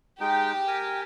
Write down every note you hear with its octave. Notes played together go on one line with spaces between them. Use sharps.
G#3 D#4 G4 G5
A#4 G#5